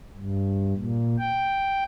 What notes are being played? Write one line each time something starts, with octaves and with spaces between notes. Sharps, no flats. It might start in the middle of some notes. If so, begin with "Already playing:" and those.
G2
A#2
G5